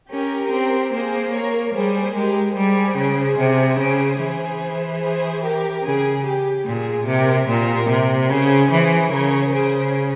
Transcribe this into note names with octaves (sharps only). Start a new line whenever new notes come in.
C#4 G4 A#4
C4
A#3 G#4 C5
A#4 C#5
G3 G#4 C5
G#3 G4 A#4
G3 G#4 C5
C#3
C3
C#3
E3
G#4 C5
G4 A#4
C#3 G#4
G4
A#2 G#4
C3 G4 A#4
A#2
C3
C#3 G#4 C5
E3 G#4 C5
C#3 A#4 C#5
C#3 G#4 C5